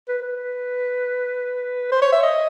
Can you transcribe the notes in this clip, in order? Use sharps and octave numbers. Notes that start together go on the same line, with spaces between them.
B4
B4
C5
C#5
E5
D#5